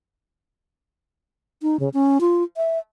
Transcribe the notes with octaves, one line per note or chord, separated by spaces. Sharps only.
D#4
C#3
C#4
F4
E5